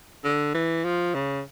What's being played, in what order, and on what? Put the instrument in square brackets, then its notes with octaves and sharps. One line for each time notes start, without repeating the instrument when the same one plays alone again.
[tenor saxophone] D3
E3
F3
C#3